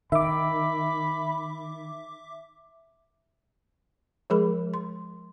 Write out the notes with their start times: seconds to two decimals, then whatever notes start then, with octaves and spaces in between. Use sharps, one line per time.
0.12 D#3 E5 B5 D6
4.30 F3 G#3 G#4 A#4 B5
4.74 C6